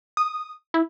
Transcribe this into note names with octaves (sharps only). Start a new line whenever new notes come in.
D#6
E4